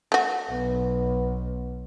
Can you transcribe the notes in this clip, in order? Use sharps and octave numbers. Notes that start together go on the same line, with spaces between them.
A3 F#4
B1 B3